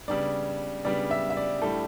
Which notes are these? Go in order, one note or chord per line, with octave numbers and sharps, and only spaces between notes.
C#3 G3 B3 D4 D5
C#3 G3 B3 D4 D5
E5
E5
D5
A2 G3 D4 A4